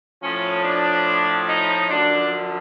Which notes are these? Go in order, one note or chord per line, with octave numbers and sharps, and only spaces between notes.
A2 F3 C#4
D4
D#4
F#2 D3 F3 D4